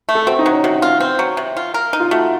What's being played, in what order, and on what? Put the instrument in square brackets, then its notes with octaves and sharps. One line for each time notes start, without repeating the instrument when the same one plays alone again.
[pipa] A3
[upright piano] A4
[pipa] C4 [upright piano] F#4
[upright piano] D#4
[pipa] F#3
[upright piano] C#4
[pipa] C3 [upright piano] F#4
[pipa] F4
C4
F#3
C3
F4
A#4
D#4
[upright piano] F4
[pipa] A3 [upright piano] F#4